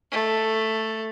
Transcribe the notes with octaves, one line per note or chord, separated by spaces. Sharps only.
A3